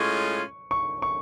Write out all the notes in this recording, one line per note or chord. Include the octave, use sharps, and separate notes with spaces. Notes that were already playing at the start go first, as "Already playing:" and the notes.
Already playing: A2 G#3 C#4 F4 C#6
C#6
C#6